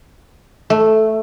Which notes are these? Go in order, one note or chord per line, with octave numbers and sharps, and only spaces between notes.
A3